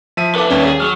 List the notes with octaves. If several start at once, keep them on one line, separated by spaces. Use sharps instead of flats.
F3 E5 D#7
A4 B4 E5 F5 D6
D#2 G3 C#4
G#4
F#3 F6